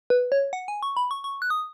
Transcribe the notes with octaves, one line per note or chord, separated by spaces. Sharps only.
B4
C#5
F#5
G#5
C#6
B5
C#6
C#6
F#6
D#6